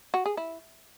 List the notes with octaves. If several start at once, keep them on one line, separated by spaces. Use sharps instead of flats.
F#4
G#4
E4